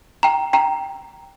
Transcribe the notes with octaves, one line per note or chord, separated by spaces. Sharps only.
G5 A#5
G5 A#5